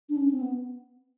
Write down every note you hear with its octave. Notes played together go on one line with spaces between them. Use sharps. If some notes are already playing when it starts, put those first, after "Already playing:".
D4
C#4
C4
B3